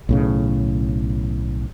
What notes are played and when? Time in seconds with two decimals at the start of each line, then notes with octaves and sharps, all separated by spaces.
0.09 B1 A2 C#3